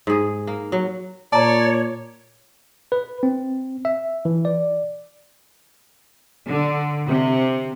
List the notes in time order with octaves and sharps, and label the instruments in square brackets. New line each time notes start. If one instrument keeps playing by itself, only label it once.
[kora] G#2 G#4
A#3
F#3
[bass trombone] A#2 [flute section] C#5 [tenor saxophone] D5 [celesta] A5 A#5
[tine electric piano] B4
C4
E5
E3
D5
[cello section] D3
C3